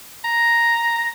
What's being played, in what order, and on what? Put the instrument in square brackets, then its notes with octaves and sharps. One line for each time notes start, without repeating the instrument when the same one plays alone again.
[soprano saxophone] A#5